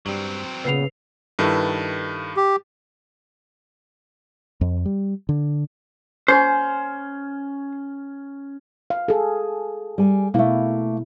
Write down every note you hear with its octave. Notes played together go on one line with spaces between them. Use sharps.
G2 F#3 G3 C4
A#2 C#3 B3 B4 C7 F7
G2 D#3 E4 A4 B4
G4
F2
G3
D3
C#4 C5
F5
G#4 A4
G3 G#5
B2 A3 A#3 E4